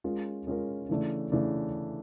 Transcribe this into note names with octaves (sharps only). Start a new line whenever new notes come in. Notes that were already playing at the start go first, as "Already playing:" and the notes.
G#3 C#4 F4 A#4
G#3 C#4 F4 A#4
C#3 E3 A3 D4
C#3 E3 A3 D4